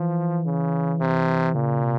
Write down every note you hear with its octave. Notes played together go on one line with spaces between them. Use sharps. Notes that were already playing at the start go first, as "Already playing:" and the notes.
Already playing: E3 F3
C#3
C3
A#2 C#3
C3